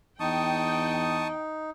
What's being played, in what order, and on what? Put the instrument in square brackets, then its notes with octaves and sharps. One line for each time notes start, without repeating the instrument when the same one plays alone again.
[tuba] E2 [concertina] D#4 [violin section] G5 [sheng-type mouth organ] A5 C#6 D#6